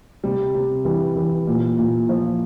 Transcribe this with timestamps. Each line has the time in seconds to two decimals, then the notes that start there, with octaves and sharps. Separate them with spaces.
0.24 C3 G3
0.54 C3
0.85 E3 G3
1.16 E3
1.47 A#2
1.79 A#2
2.09 F3